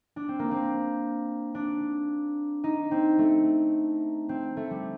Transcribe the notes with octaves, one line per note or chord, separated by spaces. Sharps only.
D4
C4
A#3
C4
D4
D#4
C4
A3
C4
A3
G3